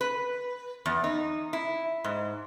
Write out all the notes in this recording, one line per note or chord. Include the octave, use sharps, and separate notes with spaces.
B4
E2
D#4
E4
G#2